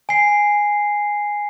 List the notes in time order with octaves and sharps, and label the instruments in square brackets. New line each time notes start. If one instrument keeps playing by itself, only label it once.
[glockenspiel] G#5 C7